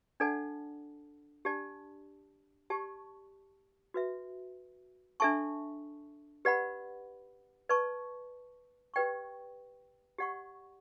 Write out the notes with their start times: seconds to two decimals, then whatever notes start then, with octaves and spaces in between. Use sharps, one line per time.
0.20 D4 A4 D5 F#5 A5
1.45 D4 G4 D5 A5
2.70 G4 D5 A5 C#6
3.94 F#4 B4 E5
5.20 D4 A4 E5 A5 C#6
6.45 G4 B4 D5 F#5 B5
7.69 B4 D5 A5 C#6
8.94 G4 B4 D5 G5 C#6
10.18 G4 D5 F#5 C#6